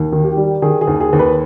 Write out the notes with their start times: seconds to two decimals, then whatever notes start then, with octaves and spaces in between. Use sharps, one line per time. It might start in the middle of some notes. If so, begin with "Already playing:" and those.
Already playing: D#2
0.12 D#3
0.24 G4
0.37 G3
0.62 D#3 G#4
0.81 G#4
0.87 D#2
1.00 G#4
1.13 D#2
1.19 B4